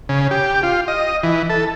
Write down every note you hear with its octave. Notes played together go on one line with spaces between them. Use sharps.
C#3
G4
F4
D#5
E3
A4